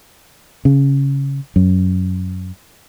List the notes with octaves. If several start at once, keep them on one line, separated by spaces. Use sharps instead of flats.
C#3
F#2